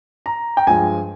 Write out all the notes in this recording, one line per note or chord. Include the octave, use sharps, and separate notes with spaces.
A#5
G5
G2 F3 G#3 G#5